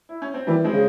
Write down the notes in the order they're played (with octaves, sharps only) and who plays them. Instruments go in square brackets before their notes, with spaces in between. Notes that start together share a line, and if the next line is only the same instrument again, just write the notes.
[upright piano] E4
C#4
C4
[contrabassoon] E3 [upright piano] G3 A#3
[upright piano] G#3 C4
[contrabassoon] C#3